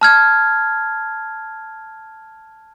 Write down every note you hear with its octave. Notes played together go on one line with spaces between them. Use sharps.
A5 F6 G#6